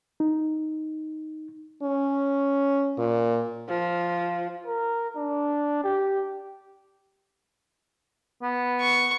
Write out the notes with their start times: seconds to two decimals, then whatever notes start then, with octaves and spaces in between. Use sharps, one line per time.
0.20 D#4
1.83 C#4
2.98 A#2
3.69 F3
4.66 A#4
5.16 D4
5.84 G4
8.43 B3
8.81 C#6